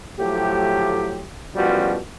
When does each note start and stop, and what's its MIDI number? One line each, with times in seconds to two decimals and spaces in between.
0.19 1.24 45
0.19 1.24 53
0.19 1.24 54
0.19 1.24 57
0.19 1.24 67
1.55 1.97 33
1.55 1.97 42
1.55 1.97 47
1.55 1.97 53
1.55 1.97 55
1.55 1.97 66